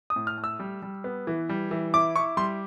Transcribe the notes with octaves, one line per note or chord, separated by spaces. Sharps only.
D#6
A2
F6
A3
E6
G3
G3
B3
E3
G3
E3
E4 D6
E4 C#6
G3 C6